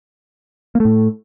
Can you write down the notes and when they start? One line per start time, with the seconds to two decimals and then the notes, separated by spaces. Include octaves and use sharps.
0.75 A#3
0.80 A3
0.85 A2